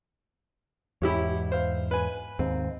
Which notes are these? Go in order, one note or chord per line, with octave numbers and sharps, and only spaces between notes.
E2 G#2 E4 G4 C#5
C5 F5
B4 G#5
D#2 G#2 C4